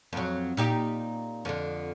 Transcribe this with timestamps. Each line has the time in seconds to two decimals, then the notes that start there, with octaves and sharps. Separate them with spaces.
0.13 F2 F#3
0.57 A#2 D#4 G4
1.45 F2 D3